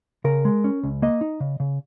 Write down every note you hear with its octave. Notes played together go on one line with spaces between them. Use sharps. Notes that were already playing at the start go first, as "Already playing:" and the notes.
C#3 A#4
G#3
C#4
C#2
A#3 D#5
D#4
C#3
C#3